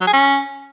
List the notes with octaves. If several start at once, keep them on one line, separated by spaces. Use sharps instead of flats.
F#3
G#4
C#4